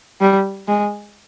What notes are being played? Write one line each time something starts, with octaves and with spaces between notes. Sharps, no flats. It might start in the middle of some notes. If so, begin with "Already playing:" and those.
G3
G#3